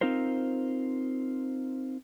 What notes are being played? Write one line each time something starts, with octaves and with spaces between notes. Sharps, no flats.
C4 D#4 F4 A#4 C5